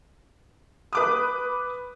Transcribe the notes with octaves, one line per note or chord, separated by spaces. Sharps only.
B4 D6 D#6